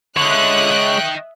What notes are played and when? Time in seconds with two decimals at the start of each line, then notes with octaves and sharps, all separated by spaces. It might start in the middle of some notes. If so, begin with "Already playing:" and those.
0.17 D3 G#3 C#5 E5 D#6 F#6
0.72 D#3 G5